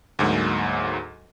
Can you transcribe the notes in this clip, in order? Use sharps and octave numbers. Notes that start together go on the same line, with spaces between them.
D2 G#2 F#3 A#3